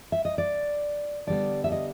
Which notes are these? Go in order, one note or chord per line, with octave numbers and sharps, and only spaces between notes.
E5
D#5
D5
D3 G3 B3 D5
E5
D#5